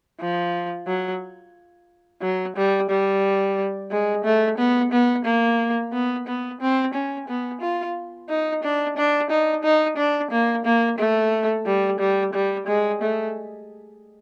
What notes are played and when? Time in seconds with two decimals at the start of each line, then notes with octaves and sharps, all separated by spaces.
0.20 F3
0.87 F#3
2.22 F#3
2.56 G3
2.90 G3
3.91 G#3
4.25 A3
4.58 B3
4.92 B3
5.25 A#3
5.92 B3
6.27 B3
6.61 C4
6.94 C#4
7.28 B3
7.61 F4
8.29 D#4
8.63 D4
8.97 D4
9.30 D#4
9.63 D#4
9.97 D4
10.31 A#3
10.65 A#3
10.98 A3
11.66 G3
11.99 G3
12.33 G3
12.67 G#3
13.01 A3